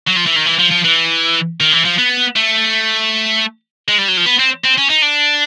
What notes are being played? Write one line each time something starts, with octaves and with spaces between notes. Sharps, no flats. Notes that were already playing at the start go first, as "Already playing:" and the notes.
F#3
F3
E3
D#3
E3
F3
F3
E3
D#3
E3
F3
B3
A3
G#3
G3
F#3
F3
B3
C4
C4
C#4
D#4
D4